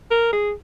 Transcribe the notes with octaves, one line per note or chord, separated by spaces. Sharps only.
A#4
G#4